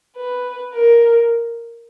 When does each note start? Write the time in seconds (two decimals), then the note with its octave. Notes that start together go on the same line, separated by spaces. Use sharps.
0.16 B4
0.73 A#4